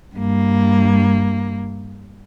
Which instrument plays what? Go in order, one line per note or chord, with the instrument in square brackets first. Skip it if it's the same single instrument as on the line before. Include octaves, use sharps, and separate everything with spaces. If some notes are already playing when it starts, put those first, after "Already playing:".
[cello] G2 A#3